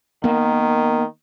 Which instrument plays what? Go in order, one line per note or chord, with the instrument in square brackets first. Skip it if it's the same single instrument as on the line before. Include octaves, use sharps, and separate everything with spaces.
[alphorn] D#3 [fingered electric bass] A#3 B3